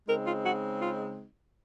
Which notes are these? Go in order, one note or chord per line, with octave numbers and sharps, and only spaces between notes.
C#3 G#3 C4 D#4 A#4
F4
F#4
F4